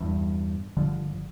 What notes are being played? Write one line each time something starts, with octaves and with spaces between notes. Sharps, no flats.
E2 G2
G1 D3 F3